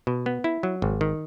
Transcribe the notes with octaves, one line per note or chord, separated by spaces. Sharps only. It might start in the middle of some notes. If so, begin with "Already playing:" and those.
B2
B3
E4
F#3
G#1
D#3